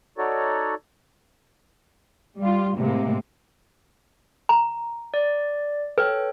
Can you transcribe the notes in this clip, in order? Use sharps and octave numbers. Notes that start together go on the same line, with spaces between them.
D#4 F#4 A4 C#5 D5
G3 F4
A2 C3 G#3 A#3
A#5
D5
A4 B4 C#5 G5